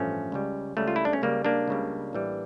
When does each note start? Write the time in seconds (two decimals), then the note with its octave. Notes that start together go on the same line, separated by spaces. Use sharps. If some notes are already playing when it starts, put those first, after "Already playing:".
Already playing: A1 G2 F3 A3 C#4
0.32 C#2 C#3 G3
0.77 C#2 C#3 G3 A3
0.88 F4
0.96 E4
1.05 D4
1.13 C#4
1.22 C#2 C#3 G3 A#3
1.45 A#3 D4
1.68 C#2 C#3 G3
2.13 A1 A2 E3 G3